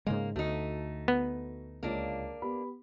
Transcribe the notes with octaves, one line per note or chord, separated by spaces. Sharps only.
G#2 C#3 G#3 A#3
D2 A3 D#4 F#4
B3
C#2 A#3 D4 F4 C#5
B3 G4 B5